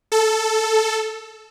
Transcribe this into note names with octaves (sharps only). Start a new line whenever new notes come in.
A4